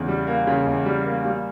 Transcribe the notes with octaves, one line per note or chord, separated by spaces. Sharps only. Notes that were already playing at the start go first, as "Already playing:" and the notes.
Already playing: E2 C#3
G3
A#3
C#3
E2
G3
A#3
G3